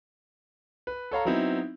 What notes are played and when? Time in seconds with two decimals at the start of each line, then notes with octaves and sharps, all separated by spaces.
0.87 B4
1.11 A4 C#5 F5 A#5
1.25 F#3 B3 C4 D#4 E4